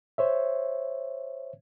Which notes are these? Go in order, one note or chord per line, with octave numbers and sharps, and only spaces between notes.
C5 C#5 E5